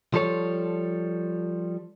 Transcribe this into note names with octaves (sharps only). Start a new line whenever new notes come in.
F3 G3 A4 C#5